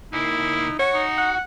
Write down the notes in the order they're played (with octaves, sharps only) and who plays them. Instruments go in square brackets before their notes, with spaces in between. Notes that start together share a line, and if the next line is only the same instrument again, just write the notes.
[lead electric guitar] C#2 A#3 [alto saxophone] D#4 [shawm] E4
[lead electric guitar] F#4 [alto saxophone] C#5
[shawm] D#4
[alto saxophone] F#5